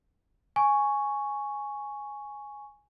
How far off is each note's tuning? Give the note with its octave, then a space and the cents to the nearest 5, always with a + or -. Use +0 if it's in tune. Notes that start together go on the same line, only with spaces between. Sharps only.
G#5 +0 C#6 +0